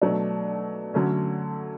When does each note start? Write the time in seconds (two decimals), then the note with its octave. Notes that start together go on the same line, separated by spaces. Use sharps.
0.02 B2 F#3 A3 D4
0.94 D3 F#3 A3 C#4